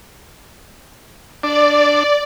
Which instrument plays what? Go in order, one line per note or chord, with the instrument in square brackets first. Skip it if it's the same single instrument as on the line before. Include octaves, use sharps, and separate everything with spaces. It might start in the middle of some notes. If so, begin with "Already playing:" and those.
[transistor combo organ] D4 [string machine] D5